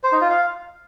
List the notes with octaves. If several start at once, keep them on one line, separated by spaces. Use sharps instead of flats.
C5
D#4
F4
F5